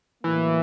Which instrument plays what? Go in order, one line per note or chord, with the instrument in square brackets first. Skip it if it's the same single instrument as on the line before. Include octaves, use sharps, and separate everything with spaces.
[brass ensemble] A2 F#3 A#3 [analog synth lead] E3